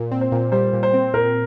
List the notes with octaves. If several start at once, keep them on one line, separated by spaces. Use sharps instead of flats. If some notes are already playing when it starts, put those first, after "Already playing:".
Already playing: A#2
C4
C5
A#2
G3 C5
A#2
C5
C4
A#2 A#4